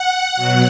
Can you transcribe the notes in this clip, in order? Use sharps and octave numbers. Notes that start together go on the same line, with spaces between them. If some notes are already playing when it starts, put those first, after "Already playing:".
Already playing: F#5
B2 F#3